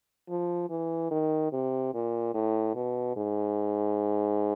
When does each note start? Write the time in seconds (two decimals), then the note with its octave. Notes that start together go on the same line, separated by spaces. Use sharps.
0.29 F3
0.70 E3
1.11 D#3
1.52 C3
1.94 A#2
2.34 A2
2.75 B2
3.16 G#2